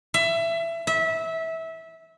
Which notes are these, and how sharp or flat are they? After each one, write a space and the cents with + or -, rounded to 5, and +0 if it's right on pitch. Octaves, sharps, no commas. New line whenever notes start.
E5 +20
E5 -20